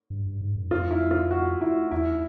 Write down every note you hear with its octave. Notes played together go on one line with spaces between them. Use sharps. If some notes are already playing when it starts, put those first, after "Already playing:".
G2
G2
G#2
F#2
F2 F4
E4
F4
F#4
E4
E2 E4